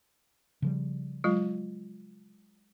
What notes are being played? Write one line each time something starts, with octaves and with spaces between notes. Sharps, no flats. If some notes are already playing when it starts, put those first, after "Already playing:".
C#3 F3 G3
F#3 G#3 F4